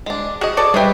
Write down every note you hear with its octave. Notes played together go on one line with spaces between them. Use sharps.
G#3 D4
F#4 G#4 D#5
A4 C#5 D5
G3 G4 G#4 B4 C#5 D#5 E5